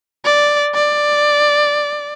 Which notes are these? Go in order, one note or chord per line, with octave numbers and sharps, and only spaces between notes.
D5
D5